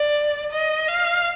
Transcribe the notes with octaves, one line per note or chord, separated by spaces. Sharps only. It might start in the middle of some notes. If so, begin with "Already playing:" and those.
Already playing: D5
D#5
F5